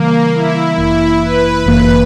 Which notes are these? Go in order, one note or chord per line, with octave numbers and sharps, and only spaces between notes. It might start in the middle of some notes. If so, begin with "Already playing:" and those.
Already playing: C#3 E3 G3 A#3
E4
G1 F#2 E3 A#3 E4
B4
G1 F#2 E3 A#3 B4